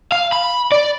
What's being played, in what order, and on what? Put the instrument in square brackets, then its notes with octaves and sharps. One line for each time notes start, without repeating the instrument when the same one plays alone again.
[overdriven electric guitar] F5
B5
D5